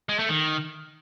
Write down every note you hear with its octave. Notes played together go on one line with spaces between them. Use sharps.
G#3
A3
D#3